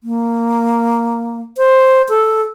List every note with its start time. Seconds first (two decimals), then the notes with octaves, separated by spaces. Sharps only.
0.03 A#3
1.57 C5
2.09 A4